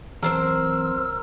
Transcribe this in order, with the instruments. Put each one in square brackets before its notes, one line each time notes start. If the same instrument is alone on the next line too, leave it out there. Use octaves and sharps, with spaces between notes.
[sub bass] E3 [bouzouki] F#3 C4 C5 [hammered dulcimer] A#4 [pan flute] E6